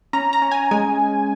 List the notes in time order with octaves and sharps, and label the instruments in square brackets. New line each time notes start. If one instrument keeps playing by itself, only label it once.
[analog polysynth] C#4 A#5
A#5
C#4
G#5
G#3 G#5